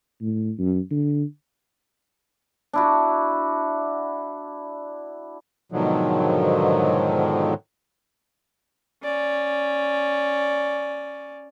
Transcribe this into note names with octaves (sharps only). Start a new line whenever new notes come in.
A2
F#2
D3
D4 E4 F#4
G#2 B2 D3 D#3 F3 F#3
C#4 D5